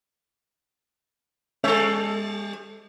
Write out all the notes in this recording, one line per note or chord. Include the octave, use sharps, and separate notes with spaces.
G3 C#4 A4 C#5 E5